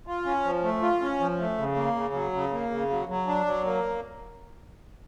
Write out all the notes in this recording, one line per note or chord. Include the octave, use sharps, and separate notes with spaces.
F4
C#4
F3
A3
F4
C#4
F3
A3
C#3
A#3
C#3
F#3
C#3
A#3
C#3
F#3
F#3
D4
F#3
A#3